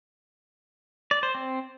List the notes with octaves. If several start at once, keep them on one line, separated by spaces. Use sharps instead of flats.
D5
C5
C4